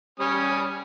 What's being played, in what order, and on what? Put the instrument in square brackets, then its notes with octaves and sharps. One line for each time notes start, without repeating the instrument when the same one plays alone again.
[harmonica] G3 C#4 D#6